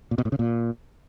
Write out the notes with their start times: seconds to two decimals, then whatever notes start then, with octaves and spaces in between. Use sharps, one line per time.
0.11 A#2
0.18 B2
0.25 A2
0.32 C#3
0.39 A#2